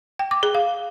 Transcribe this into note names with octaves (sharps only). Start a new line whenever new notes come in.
G5
D6
G#4
F5